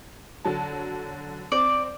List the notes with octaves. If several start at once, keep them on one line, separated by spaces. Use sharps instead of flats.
D3 F#3 A5
C4 D5